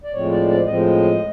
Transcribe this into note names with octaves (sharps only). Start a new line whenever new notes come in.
D5
A2 F3 G#3 C4 C#5
D5
D5
A2 F3 G#3 C4 D#5